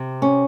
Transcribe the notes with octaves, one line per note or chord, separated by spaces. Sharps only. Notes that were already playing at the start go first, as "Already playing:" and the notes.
Already playing: C3
C#4